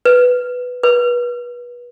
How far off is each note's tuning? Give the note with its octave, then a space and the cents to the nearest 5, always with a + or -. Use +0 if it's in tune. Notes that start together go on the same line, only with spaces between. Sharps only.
B4 +5
B4 -30